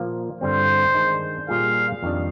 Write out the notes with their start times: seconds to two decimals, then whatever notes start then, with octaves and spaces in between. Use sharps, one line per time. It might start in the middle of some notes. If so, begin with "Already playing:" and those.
Already playing: A#2 F3 A#3
0.41 G2 D3 G3 C4 C5
0.94 D#3 G#3 D4
1.48 A#2 G3 A#3 F4 G#4 F5
2.03 F2 D#3 G3 D4